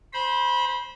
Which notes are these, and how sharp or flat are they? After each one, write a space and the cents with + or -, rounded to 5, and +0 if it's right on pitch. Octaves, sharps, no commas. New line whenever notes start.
C5 +0 B5 -25